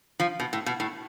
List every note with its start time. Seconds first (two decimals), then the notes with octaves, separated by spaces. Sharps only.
0.20 F3
0.40 B2
0.53 A2
0.66 B2
0.80 A2